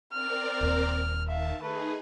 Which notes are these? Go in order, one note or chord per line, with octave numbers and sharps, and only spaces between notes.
C4 A#4 D5 F6
D#1 D#2
D#3 E5 F5 A5
A3 D#4 G#4 B4